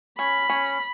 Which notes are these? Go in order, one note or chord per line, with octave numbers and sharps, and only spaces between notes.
C#4 B5
C#4